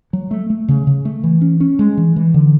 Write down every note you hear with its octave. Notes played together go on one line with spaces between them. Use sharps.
F#3
A3
A3
C#3
C#3
A3
E3
C#4
C#4
G#3
E3
E3
D3